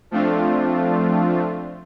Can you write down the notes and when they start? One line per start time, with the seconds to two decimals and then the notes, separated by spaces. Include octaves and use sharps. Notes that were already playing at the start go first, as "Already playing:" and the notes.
0.11 F3 A3 C4 D4 F4